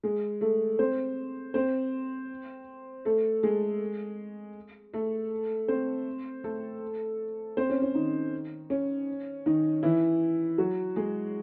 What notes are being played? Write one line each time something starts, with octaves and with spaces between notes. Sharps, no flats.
G#3 G#4
A3 A4
C4 C5
C4 C5
A3 A4
G#3 G#4
A3 A4
C4 C5
A3 A4
C4 C5
C#4
C#4
D#3 D#4
C#4
D#3 D#4
E3 E4
F#3 F#4
G#3 G#4